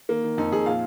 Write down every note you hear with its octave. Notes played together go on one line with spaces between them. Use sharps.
D#3 A#3
D#3
F2 D#4
F2 G#4
A#2 F5